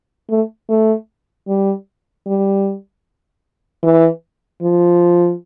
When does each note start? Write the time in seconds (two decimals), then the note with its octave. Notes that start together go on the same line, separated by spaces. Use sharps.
0.29 A3
0.69 A3
1.48 G3
2.27 G3
3.83 E3
4.62 F3